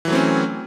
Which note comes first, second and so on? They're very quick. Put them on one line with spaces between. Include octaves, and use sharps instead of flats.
E3 F#3 A3 C4 C#4